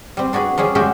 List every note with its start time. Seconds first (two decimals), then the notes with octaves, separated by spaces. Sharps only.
0.17 G3 C4
0.33 D4 F#4 G#4 B4
0.58 F3 G3 C#4 G#4
0.75 G#3 A3 C#4 F#4 G4 E5